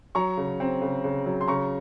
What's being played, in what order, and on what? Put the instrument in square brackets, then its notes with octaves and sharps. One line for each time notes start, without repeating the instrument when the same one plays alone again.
[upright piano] F#3 A#5 C#6
C#3
C4
C#3
C#3
F#3
C6
C#3 A#5 C#6